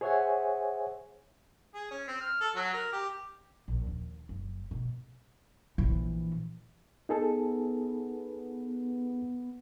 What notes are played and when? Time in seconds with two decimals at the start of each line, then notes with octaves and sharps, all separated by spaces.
0.01 G#4 C5 C#5 E5 F#5 G#5
1.74 G#4
1.91 C#4
2.07 C4
2.21 F6
2.41 A4
2.55 F#3
2.73 A#4
2.92 G4
3.68 A#1
3.86 D#2
4.29 F#1
4.71 B2
5.78 A#1 E3
7.09 B3 D#4 G#4 A4